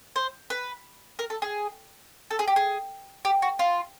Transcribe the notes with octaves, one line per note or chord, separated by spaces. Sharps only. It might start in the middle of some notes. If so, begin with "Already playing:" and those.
C5
B4
A#4
A4
G#4
A4
G#4
G4
G#4
G4
F#4
F4